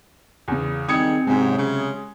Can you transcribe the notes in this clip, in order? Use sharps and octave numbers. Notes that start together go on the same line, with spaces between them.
E2 C#3
D#3 G3 C4 D#4 G#4 D#6 G#6 C#7
G#2 C3 F#3 G#3 C#4
C#3